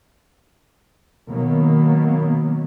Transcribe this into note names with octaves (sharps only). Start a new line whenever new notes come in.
B2 D#3 F#3 A#3 B3